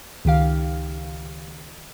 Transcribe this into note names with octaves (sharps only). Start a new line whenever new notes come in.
C#2 D#3 G4 F5